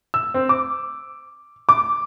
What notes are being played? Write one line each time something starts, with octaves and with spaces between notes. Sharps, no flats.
E6
C4
D6
D6